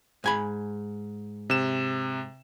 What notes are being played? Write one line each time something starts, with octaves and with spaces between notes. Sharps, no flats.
G#2 G#5 B5
C3 E7